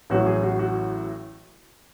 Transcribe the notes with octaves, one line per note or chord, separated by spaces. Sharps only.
A1 A2 F#3 C#4 F#4
G#4
F#4
F#4